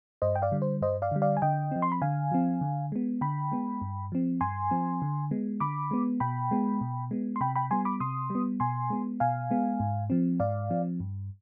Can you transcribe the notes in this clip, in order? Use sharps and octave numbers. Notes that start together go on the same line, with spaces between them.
G2 C5 D#5
G5
D5 F5
D3 G3
C5
G2 C5 D#5
D5 F5
D3 G3
D5 F5
G#5
D3 D#5 G5
F3 C4
C6
B5
D3 F5 G#5
F3 C4
D3
G#3 B3
D3 G5 B5
G#3 B3
G2
F3 C4
G2 G#5 C6
F3 C4
D3
G#3 B3
D3 B5 D6
G#3 B3
B2 G5 B5
G#3 B3
B2
G#3 B3
C6
C3 G5 B5
G5 B5
G3 B3 G#5 C6
B5 D6
C3 C6 D#6
G3 B3
B2 G#5 C6
G#3 B3
B2 F5 G#5
G#3 B3
G#2
F3 C4
G#2 D5 F5
F3 C4
G2